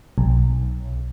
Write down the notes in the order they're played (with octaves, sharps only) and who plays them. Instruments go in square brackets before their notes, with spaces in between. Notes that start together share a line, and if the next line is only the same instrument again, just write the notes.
[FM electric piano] B1